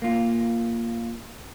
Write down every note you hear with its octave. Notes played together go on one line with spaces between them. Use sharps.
A#3 F4